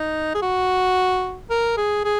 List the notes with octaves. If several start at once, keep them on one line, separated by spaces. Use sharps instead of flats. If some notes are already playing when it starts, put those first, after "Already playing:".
Already playing: D#4
G#4
F#4
A#4
G#4
G#4